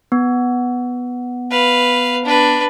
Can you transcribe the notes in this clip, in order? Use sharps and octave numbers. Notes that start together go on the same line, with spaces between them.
B3
B4 F5
D4 B4